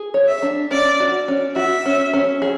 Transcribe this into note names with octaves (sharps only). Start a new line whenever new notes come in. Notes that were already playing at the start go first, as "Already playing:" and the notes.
Already playing: G#4
C#5
E5
D4
C#4 D5
F#4
C#4
F#4 E5
C#4
C#4
G#4